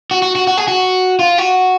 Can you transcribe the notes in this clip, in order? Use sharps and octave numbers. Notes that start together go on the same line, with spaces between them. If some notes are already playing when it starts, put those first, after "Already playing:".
F#4
F#4
F#4
F#4
G#4
F#4
F4
F#4